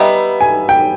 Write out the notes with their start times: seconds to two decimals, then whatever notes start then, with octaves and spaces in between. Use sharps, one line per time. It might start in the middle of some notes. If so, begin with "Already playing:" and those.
Already playing: G3 B3 D#4 E5
0.41 G#5
0.69 G5